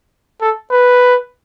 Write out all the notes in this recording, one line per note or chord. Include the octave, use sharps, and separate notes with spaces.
A4
B4